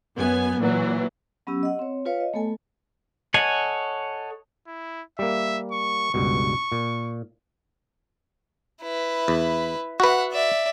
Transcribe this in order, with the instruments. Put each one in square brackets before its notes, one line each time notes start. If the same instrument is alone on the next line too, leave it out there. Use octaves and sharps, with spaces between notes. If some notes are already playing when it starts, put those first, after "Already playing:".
[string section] F#2 B3 G#5
A#2 E3 F#3
[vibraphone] F#3 B3 C#4 G4 E6
D#5 F#5
C4 C#5
F4 B4 C#5 F5
D#5
A3 B3 A4 G#5
[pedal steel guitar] A4 C#5 D#5 F#5 G#5
[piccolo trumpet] E4
[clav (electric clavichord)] G3 A#3 [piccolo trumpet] E5
[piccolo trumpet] C#6
[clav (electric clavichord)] C#2 G2 B2 [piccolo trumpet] C#6
[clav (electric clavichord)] A#2
[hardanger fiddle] E4 B4
[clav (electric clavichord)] E2
[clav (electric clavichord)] F#4 B4 [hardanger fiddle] E5 F#5
[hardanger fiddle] D5 E5